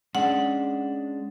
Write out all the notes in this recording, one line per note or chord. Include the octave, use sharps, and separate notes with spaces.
G#3 C#4 D4 F#5